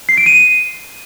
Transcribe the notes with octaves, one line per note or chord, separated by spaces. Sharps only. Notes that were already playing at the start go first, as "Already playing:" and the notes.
C7
D7
D#7